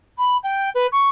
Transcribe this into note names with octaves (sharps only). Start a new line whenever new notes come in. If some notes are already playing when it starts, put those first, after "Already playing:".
B5
G5
B4
C#6